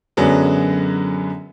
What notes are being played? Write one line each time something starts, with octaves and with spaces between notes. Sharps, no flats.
F#2 D3 F#3 G#3 B3